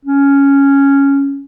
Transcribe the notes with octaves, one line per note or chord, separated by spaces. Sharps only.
C#4